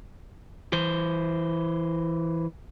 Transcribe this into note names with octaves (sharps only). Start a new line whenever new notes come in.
E3 C5